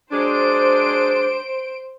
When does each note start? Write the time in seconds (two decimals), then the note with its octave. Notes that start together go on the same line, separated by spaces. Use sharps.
0.11 F#3 G#3 D4 C5 D7